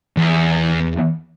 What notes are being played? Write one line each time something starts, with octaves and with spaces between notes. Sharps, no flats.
E2